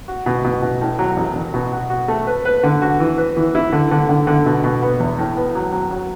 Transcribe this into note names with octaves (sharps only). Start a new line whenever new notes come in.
F#4
B2
B2
B2
A2
F#3
A1
A1
B2
F#4
F#4
A3
B4
B4
D3
F#4
E3
B4
E3
E4
D3
D3
D3
D3
B2
B2
B3
E2
A2
B3
F#3
F#3
F#3